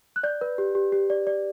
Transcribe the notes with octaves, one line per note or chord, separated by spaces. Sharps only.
F#6
D5 G6
B4
G4
G4
G4
D5
D5